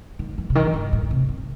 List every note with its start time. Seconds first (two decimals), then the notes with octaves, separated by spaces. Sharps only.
0.19 D#3
0.38 E3
0.50 C3
0.55 D#3
0.73 G2
0.93 A2
1.11 C3
1.29 D#3